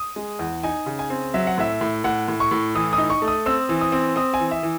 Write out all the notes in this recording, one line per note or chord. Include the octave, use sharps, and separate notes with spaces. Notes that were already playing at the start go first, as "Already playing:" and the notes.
Already playing: D#6
G#3
E2
D#4 G#5
C#3
G#5
C4
F#3 E5
F#5
A2 E5
A2
A2 F#5
A2
C#6
A2
E3 D#6
D#6
D#4
C#6
A3
D#6
C4 E6
E3
D#6
C4
C4 D#6
G#5
E3
E5
E3